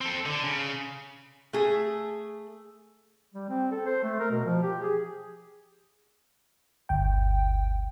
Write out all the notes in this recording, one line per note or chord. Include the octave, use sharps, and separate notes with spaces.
C4 A4
D3
C#3
A3 G#4
G3
C4
A4
C5
A3
A#4
B2
F3
G4
G#4
G1 D2 G5